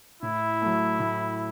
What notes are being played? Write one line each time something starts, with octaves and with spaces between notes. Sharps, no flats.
A2 E4
F#3 A3
A2